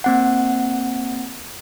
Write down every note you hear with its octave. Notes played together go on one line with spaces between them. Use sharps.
A#3 C4 F#5